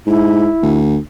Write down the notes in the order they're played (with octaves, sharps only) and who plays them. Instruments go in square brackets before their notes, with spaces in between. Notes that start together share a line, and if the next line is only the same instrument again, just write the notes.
[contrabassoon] G#2 [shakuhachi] E4
[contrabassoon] D2